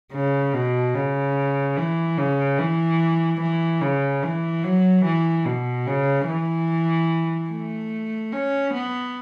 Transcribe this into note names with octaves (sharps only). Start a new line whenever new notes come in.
C#3
B2
C#3
E3
C#3
E3
E3
C#3
E3
F#3
E3
B2
C#3
E3
A3
C#4
B3